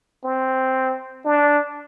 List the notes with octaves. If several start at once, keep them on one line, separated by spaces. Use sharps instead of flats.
C4
D4